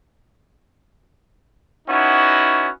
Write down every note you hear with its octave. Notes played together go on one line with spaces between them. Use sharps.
B3 C#4 D#4 E4 F#4